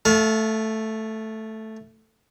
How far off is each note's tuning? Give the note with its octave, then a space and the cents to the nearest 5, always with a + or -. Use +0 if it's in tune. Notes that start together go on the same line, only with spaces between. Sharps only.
A3 +0 F5 +25 A5 -35